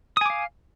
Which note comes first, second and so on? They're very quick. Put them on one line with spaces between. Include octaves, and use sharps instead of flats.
D#6 G#5 D6 F5